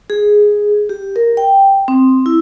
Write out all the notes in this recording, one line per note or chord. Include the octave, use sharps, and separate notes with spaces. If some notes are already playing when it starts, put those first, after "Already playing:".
G#4
G4
A#4
G5
C4
E4